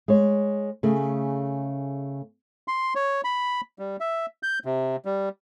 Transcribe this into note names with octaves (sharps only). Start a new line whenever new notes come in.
G#3 C#5
C#3 A3 G#4
C6
C#5
B5
G3
E5
G6
C3
G3